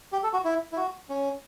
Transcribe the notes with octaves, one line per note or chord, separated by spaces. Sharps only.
G4
A4
F#4
E4
E4
F#4
C#4